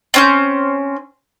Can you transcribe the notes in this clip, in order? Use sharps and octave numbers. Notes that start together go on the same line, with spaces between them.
C4 C#4 G6